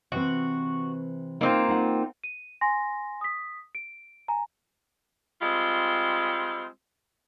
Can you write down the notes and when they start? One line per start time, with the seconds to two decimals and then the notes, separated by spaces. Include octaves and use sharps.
0.12 C3 E3 C4 F#4
1.41 A#3 C4 D#4 F4
1.68 D#4 F#5
2.24 D#7
2.61 G#5 C6 A#6
3.21 D#6 B6
3.75 D7
4.28 G#5 A#5
5.42 G3 G#3 C4 F4